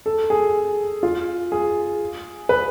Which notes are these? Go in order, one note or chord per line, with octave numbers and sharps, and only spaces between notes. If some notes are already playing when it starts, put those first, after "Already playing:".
A4
G#4
F4
G#4
B4